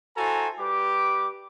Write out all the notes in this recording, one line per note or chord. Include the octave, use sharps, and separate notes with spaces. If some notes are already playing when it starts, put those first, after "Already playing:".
E4 F#4 A4 C5 G#5 A#5
G3 G4 B4 D6